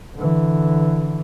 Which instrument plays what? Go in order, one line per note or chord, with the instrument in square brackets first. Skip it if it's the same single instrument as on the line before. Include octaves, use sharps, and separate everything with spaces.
[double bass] D3 E3